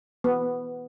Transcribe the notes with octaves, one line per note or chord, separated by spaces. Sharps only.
B3